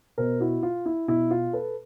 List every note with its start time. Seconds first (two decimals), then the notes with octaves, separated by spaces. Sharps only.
0.18 B2 A#4 C5
0.40 E4 F#4
0.63 F4
0.86 E4
1.08 B2 E4
1.31 F4
1.53 A4 B4